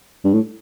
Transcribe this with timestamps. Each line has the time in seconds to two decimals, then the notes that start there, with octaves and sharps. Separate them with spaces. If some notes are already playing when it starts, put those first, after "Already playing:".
0.25 G2
0.33 A2